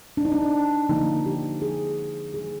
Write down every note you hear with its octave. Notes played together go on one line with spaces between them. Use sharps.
D4
D#4
D4
D3 F3 A#3 D#4
G4
G#4
D#3 G3 A#3 G#4